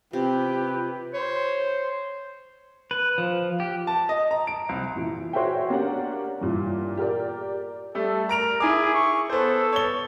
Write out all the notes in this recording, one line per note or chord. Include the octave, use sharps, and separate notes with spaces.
C3 F4 G4 B4
C5 C#5
B4
F3
G4
A5
D#5
A#5
D7
C2
A#2 E3
F#4 C5 C#5 E5 G5
A#3 C#4 D4 G4 F#5
G2 A#2 E3
G4 A#4 D5
G3 A3 A4
A#4 A#5 D7 F7
E4 G#4 G#5 D6
C#6
B3 A4 C5
C#5 G7